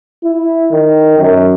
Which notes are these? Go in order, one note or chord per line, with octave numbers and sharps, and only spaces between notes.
E4
D#3
F#2